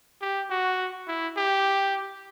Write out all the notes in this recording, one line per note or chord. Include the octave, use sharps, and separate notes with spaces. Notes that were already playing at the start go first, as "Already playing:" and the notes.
G4
F#4
E4
G4